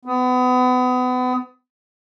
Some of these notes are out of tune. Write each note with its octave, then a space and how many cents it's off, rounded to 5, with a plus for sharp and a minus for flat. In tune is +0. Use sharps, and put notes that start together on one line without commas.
B3 +30